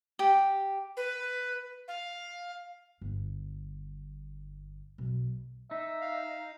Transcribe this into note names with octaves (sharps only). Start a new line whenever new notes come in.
G4
B4
F5
G1
B1
D#4 E5
F5